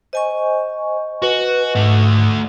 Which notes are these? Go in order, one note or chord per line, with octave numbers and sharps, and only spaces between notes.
C5 D#5 G#5 C#6
F#4 B4
G#2 A3 F#4